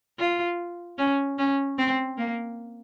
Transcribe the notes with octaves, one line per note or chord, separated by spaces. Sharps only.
F4
C#4
C#4
C4
A#3